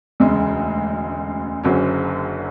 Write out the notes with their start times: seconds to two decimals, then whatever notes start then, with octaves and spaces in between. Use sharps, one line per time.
0.20 E1 D2 C#3 G#3
1.64 F#1 F#2 D3 F#3 C#4